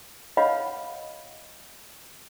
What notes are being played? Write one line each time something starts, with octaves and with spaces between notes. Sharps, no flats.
B4 C#5 D#5 F5 F#5 B5